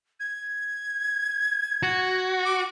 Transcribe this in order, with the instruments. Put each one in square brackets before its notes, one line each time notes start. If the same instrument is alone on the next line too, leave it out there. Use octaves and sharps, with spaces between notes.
[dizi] G#6
[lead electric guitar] F#4
[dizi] D6